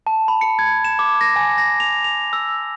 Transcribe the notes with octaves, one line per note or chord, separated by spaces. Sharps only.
A5
B5
C#7
G#6
E7
D6
A#6
G#5
A#6
F7
F7
E6